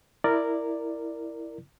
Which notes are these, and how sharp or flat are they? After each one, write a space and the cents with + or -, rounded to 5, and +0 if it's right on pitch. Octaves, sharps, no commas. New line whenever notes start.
E4 +0 A#4 -10 D5 +5